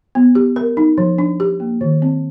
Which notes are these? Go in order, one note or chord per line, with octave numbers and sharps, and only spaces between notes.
B3
G4
A#4
D#4
F3
D4
G4
A#3
D#3
C4